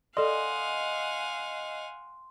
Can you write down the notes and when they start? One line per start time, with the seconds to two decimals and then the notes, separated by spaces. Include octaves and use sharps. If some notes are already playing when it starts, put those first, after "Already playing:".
0.17 A4 D5 D#5 F5 F#5 G#5 C6